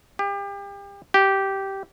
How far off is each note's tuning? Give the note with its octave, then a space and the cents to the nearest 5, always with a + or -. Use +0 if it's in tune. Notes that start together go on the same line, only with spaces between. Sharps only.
G4 +35
G4 -10